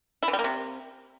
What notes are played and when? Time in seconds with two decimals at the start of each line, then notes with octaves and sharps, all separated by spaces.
0.23 E4
0.28 E3
0.33 G3
0.39 A#3
0.44 C3